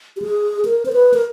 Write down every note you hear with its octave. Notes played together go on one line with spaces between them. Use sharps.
G4
G#4
A#4
C5
B4
A#4